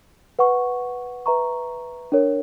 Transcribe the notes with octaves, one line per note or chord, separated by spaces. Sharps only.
B4 F#5 C#6
B4 E5 A#5 C#6
D4 A#4 C#5